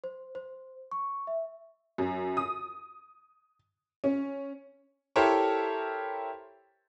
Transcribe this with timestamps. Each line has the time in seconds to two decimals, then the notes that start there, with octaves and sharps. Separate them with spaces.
0.04 C5
0.35 C5
0.91 C#6
1.27 E5
1.98 F#2
2.37 D#6
4.04 C#4
5.16 E4 G4 A4 A#4 C5 C#5